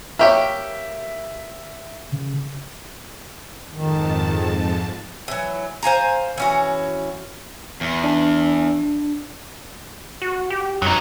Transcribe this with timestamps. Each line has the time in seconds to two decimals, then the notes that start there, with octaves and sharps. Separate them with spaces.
0.19 A#3 G4 C#5 E5
2.12 C#3
3.72 F2 G#2 D#3 A5
5.28 E3 F#3
5.83 C5 F5 G#5 A#5
6.38 E3 C#4 F#4
7.81 E2
8.04 D4
10.22 F#4
10.50 G4
10.82 F#2 F#3 D#4